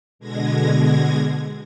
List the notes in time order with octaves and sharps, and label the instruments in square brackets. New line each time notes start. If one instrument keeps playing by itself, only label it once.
[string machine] B2 D3 G#3 G#6 A#6